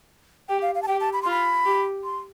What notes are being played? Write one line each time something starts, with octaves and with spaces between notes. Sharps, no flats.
G4 G5
F5
F5
A5
G4 G5
A5
B5
F4 C6
B5
G4
C6